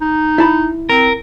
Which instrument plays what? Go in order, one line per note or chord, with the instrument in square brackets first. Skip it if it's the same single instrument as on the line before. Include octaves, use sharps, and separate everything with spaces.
[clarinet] D#4
[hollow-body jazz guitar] E4 A5 B5
[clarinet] C4 [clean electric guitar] A#4